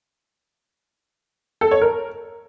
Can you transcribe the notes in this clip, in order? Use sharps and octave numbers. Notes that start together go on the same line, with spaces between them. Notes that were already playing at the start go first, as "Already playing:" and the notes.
A4
C#5
A#4